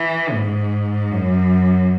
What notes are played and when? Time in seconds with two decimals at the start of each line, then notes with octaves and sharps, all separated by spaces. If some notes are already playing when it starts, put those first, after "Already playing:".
Already playing: E3
0.34 G#2
1.12 F#2